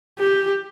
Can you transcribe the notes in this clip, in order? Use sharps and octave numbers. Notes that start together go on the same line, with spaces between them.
G4